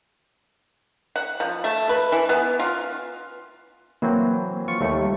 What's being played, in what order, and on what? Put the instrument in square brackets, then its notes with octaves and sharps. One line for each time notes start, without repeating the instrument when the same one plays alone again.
[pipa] F#5
F3
A3
B4
E3
B3
F4
[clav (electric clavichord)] E3 F#3 C4 [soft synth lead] A#3
[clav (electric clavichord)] F4 [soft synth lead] C#6
[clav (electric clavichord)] D#2 A3 [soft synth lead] G3